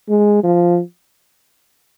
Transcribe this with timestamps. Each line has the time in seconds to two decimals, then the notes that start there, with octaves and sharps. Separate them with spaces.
0.09 G#3
0.44 F3